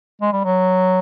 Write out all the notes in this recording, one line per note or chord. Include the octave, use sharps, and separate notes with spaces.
G#3
G3
F#3